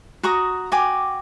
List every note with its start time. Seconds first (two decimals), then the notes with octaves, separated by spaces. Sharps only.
0.23 F#4 A#5 C#6 D#6
0.72 F#4 G5 G#5 D6